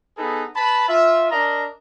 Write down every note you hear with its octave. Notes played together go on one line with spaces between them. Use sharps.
B3 D#4 G#4 A4 B4
B4 A5 B5
F4 E5
D4 A#4 D#5 A#5